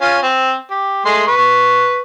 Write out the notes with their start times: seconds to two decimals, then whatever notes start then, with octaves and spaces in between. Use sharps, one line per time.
0.01 C#4 F4
0.22 C4
0.71 G4
1.05 G#3 A3 C6
1.27 B4 C#6